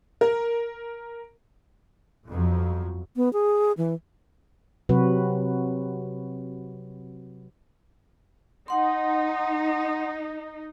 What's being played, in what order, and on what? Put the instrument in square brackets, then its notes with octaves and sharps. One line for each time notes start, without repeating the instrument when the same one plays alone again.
[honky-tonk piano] A#4
[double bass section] G1 F2 F3 F#3
[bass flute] B3
G#4
E3
[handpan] C3 F#3 C4 F#4 B4
[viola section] D#4 [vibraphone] F#5 C6